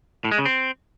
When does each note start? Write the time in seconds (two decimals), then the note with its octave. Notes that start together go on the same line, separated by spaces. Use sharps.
0.24 A2
0.31 G#3
0.38 C#3
0.45 C4